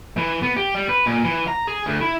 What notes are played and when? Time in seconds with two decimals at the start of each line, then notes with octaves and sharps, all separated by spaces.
0.17 E3
0.42 B3
0.57 G4
0.75 G3
0.89 B4
1.06 A#2
1.24 E3
1.48 A#5
1.67 G#4
1.86 D2
2.01 E4